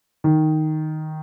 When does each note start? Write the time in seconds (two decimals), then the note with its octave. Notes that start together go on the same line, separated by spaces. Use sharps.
0.24 D#3